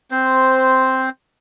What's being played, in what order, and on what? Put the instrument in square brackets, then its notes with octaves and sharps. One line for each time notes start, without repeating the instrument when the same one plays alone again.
[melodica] C4 C5